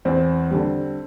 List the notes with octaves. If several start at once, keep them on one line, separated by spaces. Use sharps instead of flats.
E2 C4
D3 G3